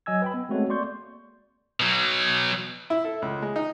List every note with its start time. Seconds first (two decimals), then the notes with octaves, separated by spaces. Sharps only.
0.06 F#3 D#5 G#5 E6 G#6
0.22 B4 G5 B5
0.34 B3
0.49 G#3 A3 C4 F#4 A4 C#5
0.69 A#3 D5 C6 C#6 G6
1.80 B2 F#3
2.90 E4
3.05 A4
3.22 C#2
3.42 G#3
3.56 D#4